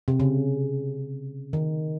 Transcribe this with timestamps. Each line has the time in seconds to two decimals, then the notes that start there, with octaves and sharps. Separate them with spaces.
0.08 C3
0.20 C#3
1.53 D#3